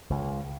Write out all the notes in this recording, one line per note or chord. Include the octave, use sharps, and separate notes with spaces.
C#2